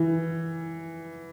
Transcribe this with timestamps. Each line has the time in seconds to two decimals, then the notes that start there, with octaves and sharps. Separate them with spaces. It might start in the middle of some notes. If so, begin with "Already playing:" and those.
Already playing: E3